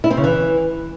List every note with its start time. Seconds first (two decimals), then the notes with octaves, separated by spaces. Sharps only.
0.04 E4
0.10 C4
0.17 C#3
0.24 E3